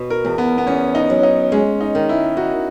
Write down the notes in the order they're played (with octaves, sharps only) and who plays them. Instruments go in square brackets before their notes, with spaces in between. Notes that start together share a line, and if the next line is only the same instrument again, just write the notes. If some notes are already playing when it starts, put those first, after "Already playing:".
Already playing: [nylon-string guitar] B2
[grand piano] A#4
[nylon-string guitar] E2
[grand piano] B3
B3
[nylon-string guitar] E2 [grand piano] C#4
[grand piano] D#4
[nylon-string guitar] F#3
[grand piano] D#4
[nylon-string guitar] G#3 [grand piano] C#4
[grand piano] D#4
[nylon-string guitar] D#3
[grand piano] E4
[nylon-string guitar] D#4 [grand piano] F#4